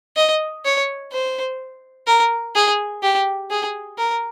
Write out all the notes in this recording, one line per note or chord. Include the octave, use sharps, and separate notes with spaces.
D#5
C#5
C5
A#4
G#4
G4
G#4
A#4